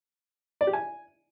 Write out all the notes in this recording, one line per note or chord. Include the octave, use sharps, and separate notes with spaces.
D5
G4
G#5